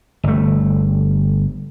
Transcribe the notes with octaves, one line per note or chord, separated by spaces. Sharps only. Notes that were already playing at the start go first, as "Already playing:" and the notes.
G1 A3